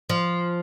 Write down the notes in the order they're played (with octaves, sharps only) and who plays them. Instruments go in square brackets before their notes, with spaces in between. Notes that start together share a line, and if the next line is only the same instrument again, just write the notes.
[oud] F3